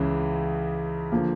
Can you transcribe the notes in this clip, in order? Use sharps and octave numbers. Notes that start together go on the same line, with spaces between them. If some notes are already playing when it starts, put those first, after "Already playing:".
Already playing: C#2 C#3 E3
D3 F3 A#3